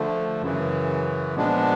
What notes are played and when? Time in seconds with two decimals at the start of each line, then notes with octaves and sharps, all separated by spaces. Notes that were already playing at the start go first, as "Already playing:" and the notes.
Already playing: D3 F3 A3
0.41 F#2 C#3 E3
1.36 A#2 F3 G#3 B3 D4